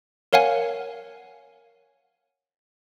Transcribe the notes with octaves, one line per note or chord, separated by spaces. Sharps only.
A#4 C#5 F5 F#5 G#5